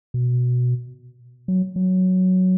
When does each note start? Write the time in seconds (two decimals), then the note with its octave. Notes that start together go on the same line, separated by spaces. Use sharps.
0.14 B2
1.48 F#3
1.76 F#3